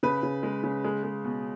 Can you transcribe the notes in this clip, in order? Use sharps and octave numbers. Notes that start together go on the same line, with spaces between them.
C#3 B4
C#3
G#3
C#3
G#3
G#3
B2